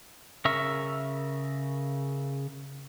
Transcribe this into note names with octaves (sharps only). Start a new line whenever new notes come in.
C#3 A#4 E5 C#6